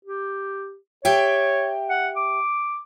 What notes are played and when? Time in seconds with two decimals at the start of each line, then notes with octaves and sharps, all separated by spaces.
0.05 G4
1.05 G4 C#5 E5 G5
1.90 F#5
2.16 D6